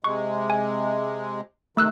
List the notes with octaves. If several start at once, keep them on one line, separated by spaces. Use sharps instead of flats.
C3 G#3 C#6
G#5
C3 D#3 A3 E6 F#6